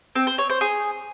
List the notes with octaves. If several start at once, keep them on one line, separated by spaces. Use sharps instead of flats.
C4
C5
C#5
C5
G#4